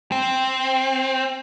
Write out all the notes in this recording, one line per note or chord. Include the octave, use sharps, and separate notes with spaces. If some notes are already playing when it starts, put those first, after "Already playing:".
C4